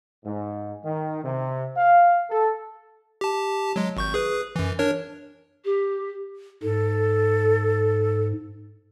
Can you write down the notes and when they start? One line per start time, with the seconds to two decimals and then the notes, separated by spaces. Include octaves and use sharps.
0.25 G#2
0.85 D#3
1.24 C3
1.77 F5
2.30 A4
3.21 G4 A5
3.76 F#3 G#3
3.97 G#1 C#6 G6
4.14 G#4 B4
4.56 F#2 E3
4.79 D4 A#4 C#5
5.65 G4
6.63 G#2 A4